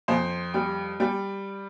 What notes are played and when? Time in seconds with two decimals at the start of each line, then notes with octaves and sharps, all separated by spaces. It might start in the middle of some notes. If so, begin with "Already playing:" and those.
0.08 F2 C5
0.54 G3 G5
1.00 G3 G5